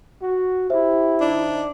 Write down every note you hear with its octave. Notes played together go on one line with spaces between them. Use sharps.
F#4
E4 G4 C5 E5
D3 D4 D#4